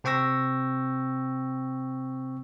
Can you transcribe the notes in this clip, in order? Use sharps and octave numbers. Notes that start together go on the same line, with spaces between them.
C3 C4 G5 C#6 E6 A#6